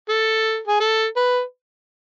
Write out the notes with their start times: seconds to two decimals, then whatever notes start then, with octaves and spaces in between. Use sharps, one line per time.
0.09 A4
0.68 G#4
0.80 A4
1.16 B4